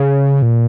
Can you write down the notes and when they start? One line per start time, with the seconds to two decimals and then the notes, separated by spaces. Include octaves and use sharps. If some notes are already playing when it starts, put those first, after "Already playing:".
Already playing: C#3
0.42 A#2